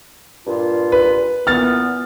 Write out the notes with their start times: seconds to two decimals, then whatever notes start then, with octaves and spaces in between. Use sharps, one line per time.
0.47 G2 A#2 F4
0.92 B4
1.47 A#2 E3 B3 F6 A6